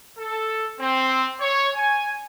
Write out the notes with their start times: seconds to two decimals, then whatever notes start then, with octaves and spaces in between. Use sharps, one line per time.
0.18 A4
0.80 C4
1.40 C#5
1.76 G#5